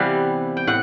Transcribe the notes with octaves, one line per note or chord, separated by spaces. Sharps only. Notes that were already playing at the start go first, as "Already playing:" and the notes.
Already playing: C3 E3 G3 B3 F5
G5
A2 F#5